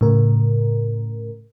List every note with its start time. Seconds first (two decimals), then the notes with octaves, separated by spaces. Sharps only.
0.01 A2 C#3 A#4